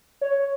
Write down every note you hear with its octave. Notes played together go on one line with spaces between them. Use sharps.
C#5